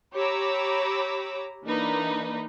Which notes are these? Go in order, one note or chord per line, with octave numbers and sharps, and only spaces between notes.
G4 C#5 A#5 B5 D6 E6
E3 A#3 D4 D#4 B4